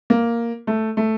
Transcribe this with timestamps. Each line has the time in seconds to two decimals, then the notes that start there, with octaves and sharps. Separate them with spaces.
0.10 A#3
0.67 A3
0.97 A3